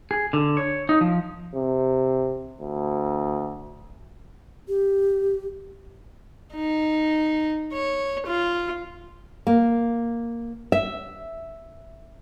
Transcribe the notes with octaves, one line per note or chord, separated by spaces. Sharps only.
G#4
D3
C#5
D#4
F3
C3
D2
G4
D#4
C#5
F4
A#3
E5